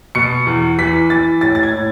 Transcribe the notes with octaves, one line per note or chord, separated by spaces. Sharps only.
B2 C#7
E2
E3 B6
E3 A6
A2 A6
A6
G#6
A2